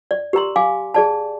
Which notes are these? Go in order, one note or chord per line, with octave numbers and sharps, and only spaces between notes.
D5
G4 A#4 A#5 C6
F5 G#5 D6
G#4 D5 A5